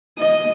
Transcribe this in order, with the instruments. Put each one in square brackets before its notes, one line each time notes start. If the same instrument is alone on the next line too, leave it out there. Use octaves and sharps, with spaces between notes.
[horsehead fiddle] D#5